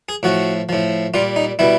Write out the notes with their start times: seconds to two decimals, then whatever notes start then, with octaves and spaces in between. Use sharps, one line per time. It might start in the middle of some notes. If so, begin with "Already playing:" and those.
0.09 G#4
0.23 A2 F3 F#4
0.69 A2 F3
1.14 A#2 G3 F4
1.36 D#4
1.59 B2 G3 E4